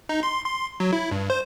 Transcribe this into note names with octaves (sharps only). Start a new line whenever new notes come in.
D#4
C6
C6
F#3
E4
G2
C5